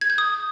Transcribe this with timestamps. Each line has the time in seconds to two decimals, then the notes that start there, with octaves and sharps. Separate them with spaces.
0.01 G#6
0.10 G6
0.18 D#6